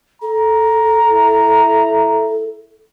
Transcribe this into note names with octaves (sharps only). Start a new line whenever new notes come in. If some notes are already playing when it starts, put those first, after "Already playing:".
A4 A#5
E4